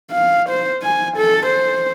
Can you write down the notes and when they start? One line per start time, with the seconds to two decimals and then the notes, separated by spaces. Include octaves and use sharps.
0.11 F5
0.49 C5
0.83 G#5
1.17 A4
1.46 C5